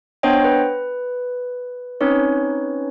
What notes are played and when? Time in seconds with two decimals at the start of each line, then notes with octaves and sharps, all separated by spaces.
0.23 B3 D4 C5 C#5 D#5 G5
0.44 B4
2.01 C4 C#4 D#4 B4 C#5